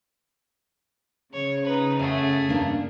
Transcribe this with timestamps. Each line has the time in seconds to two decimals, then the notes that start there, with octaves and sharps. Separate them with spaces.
1.33 C#3 C#5
1.65 D#4 B4
1.99 F#2 A3 G#4
2.49 G2 A#3 D4